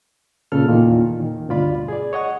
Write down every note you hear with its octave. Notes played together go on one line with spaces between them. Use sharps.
A#2 C#3 A4 F6
E2 A#2 D#3
D#3
D2 G2 B2 F4 D5 B5
G#4 D5
C#5 D#5 F#5 C#6